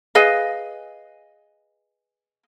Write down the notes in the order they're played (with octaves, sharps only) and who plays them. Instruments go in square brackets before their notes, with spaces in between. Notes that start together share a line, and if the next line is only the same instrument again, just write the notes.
[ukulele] G#4 B4 D#5 F5